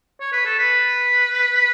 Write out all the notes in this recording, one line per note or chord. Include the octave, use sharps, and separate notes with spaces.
C#5
B4
A4
B4